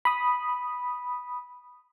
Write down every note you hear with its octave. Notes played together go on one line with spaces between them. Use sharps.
B5 D#6